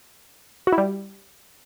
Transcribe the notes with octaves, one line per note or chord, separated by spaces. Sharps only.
F#4
E4
G3